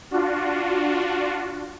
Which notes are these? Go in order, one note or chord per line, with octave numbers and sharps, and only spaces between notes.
D4 F4 F#4